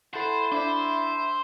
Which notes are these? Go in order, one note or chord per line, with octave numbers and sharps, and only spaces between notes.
E4 A4 C5 F#5 A5
D4 C5 E5 B5